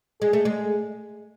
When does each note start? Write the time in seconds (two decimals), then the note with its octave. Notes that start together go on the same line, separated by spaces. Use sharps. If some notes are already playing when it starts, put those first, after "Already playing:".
0.22 G#3 G#4
0.33 A3
0.45 G#3